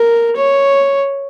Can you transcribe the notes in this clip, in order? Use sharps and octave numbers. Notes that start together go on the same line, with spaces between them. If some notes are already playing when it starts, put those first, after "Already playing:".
Already playing: A#4
C#5